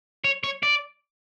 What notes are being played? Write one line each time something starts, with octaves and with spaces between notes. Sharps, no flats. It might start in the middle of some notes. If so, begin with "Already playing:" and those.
C#5
C#5
D5